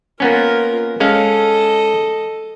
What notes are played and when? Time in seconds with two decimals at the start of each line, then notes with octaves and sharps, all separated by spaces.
0.20 A#3 B3 C#4 F4 A#4
1.00 G#3 C#4 A4 D#5 F5